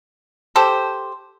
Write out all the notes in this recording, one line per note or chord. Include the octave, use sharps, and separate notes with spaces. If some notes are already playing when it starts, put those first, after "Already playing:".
G4 A4 C5